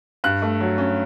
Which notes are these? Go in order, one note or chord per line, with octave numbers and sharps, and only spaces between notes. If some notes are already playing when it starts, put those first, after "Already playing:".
G2 F#6
A3
F#3
C#4